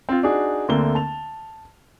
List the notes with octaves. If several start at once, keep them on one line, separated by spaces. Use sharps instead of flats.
C4 F4
D4 D#4 F#4 G#4
D2 D3 A3 A#3 C4 G7
A5 F7